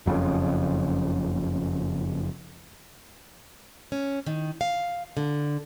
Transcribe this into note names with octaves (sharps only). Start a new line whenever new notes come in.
F#1 F2 A#2 C#3
C#4
D#3
F5
D3